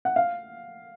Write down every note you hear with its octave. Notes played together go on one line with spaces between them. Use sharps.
F#5
F5